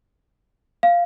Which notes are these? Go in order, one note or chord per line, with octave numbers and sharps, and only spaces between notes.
F5